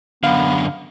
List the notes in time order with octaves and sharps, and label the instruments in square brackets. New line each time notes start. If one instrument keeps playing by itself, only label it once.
[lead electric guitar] F#2 D3 [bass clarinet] B3 [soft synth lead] F5